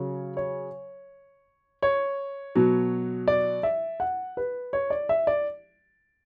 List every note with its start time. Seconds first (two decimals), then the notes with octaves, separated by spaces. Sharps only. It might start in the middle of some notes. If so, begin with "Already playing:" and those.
Already playing: C#3 F#3 C#5
0.37 C#5
1.82 C#5
2.55 B2 F#3
3.28 D5
3.63 E5
4.00 F#5
4.37 B4
4.73 C#5
4.90 D5
5.09 E5
5.27 D5